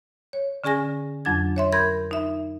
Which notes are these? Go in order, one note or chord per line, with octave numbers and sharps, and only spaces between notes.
C#5
D3 C#4 G#4 G#5 A#6
F2 F#3 D4 G#6
C#5 E5 C6
A#4 B5 C6 G6 G#6
D#4 E5